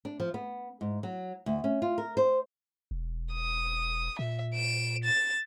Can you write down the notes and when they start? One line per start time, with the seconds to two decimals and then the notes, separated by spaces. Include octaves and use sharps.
0.05 D4
0.20 F3
0.34 B3
0.81 G#2
1.03 F#3
1.46 D2
1.64 C#4
1.82 F4
1.98 A#4
2.17 C5
2.91 E1
3.33 D#6
4.19 A#2 E5
4.54 D7 E7
5.04 A6 E7